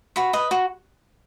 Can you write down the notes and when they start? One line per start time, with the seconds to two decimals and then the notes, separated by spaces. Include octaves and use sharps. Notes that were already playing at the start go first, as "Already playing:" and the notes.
0.16 F#4 B5
0.33 B4 D#5
0.51 F#4